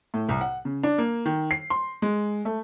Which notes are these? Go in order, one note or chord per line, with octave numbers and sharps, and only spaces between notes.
A2
C2
F#5
C#3
D4
A#3
D#3
C7
C6
G#3
A3